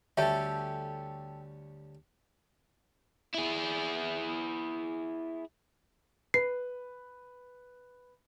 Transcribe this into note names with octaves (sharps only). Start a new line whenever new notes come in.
D2 G3 C#4 A4 E5 G5 A5
E4 G#4
B4 C7